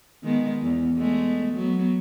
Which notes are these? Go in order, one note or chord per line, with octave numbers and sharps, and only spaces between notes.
D#3 G#3 B3
E2
G#3 A3 B3
F#3 B3